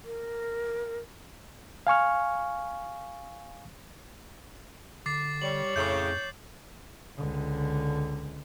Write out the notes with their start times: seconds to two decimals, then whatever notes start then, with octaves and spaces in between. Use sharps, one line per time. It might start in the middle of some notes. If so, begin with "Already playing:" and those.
0.04 A#4
1.87 F5 G#5 C#6 F6
5.06 D3 D6 A6 C7
5.41 G3 C#5 F#7
5.76 F2 A2 C#3 G6 C7
7.17 C#2 D3